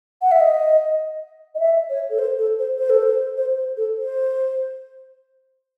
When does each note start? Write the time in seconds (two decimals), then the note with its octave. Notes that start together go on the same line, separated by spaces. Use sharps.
0.22 F#5
0.31 E5
0.40 D#5
1.55 D#5
1.60 E5
1.90 C#5
2.10 A4
2.19 C5
2.38 A4
2.59 C5
2.79 C5
2.90 A4
3.03 C5
3.37 C5
3.57 C5
3.77 A4
3.98 C5